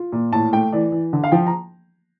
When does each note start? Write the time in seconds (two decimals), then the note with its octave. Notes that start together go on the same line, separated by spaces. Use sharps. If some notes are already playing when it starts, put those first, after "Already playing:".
Already playing: F4
0.12 A#2
0.32 A2 A5
0.53 A3 G5
0.72 E3 D5
0.92 E3
1.13 D3
1.24 F5
1.32 F3 G5
1.47 A#5